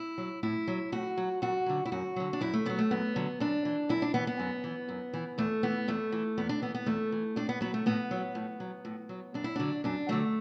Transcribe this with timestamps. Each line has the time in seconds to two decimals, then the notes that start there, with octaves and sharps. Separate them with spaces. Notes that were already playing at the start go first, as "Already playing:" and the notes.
Already playing: E4
0.18 F#3
0.43 A2 E4
0.68 F#3
0.92 A2 F#4
1.17 F#3
1.42 F#2 F#4
1.66 D3 F#3
1.85 E4
1.92 F#2 F#4
2.16 D3 F#3
2.33 D4
2.41 F#2 E4
2.53 A3
2.66 D3 F#3 B3
2.79 A3
2.91 F#2 B3
3.16 D3 F#3
3.40 F#2 D4
3.65 E3
3.89 F#2 E4
4.02 D4
4.14 E3 B3
4.27 B3
4.40 F#2
4.64 E3
4.89 F#2
5.14 E3
5.38 E2 A3
5.63 E3 B3
5.88 E2 A3
6.12 E3
6.37 E2 B3
6.49 D4
6.62 E3 B3
6.74 B3
6.86 E2 A3
7.12 E3
7.36 A2 D4
7.49 B3
7.61 F#3 B3
7.74 A3
7.86 A2 B3
8.11 F#3
8.35 A2
8.60 F#3
8.85 A2
9.09 F#3
9.34 F#2 D4
9.44 E4
9.56 D3 F#3 D4
9.84 F#2 D4
10.09 D3 F#3 A3